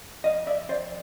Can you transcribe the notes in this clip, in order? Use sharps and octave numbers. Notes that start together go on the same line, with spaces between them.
F2 D#5 F5
D5 E5
F2 C5 D5